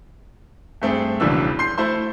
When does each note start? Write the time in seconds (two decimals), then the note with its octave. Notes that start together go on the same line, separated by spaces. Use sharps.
0.82 G2 A3 C4 G#4
1.20 E1 A#1 C#3 E3 D4 E6
1.59 C6 G6 C7
1.78 A3 E4 C5 C6